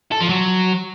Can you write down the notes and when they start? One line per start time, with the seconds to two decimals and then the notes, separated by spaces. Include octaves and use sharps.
0.12 A4
0.20 F3
0.29 F#3